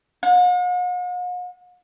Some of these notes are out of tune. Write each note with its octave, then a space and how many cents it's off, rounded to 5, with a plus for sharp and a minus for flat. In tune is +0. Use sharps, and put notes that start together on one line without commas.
F#5 -45